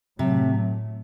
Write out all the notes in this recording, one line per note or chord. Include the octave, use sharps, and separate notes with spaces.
A2 C3 F#3 A3